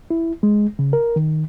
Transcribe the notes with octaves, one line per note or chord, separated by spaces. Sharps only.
E4
G#3
C#3
A#4
D#3